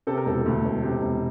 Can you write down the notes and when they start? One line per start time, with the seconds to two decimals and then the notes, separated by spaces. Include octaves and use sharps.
0.07 C3 A4
0.17 A#4
0.26 E1 A4
0.46 D2
0.65 E1
0.83 C3
1.02 E1